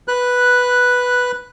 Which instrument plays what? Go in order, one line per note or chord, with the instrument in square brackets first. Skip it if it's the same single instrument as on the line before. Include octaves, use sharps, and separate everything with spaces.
[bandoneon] B4 F#6